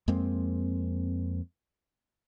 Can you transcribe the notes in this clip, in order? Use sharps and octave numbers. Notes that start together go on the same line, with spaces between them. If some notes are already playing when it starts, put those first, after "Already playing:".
F2 G#3 A#3 C4